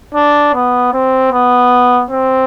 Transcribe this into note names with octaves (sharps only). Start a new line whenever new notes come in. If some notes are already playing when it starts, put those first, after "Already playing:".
D4
B3
C4
B3
C4